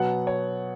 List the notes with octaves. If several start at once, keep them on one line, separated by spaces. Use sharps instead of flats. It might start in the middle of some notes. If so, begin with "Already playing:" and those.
Already playing: B2 F#3 B3 F#5
C#5